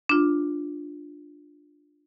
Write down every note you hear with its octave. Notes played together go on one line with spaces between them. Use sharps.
D4 F4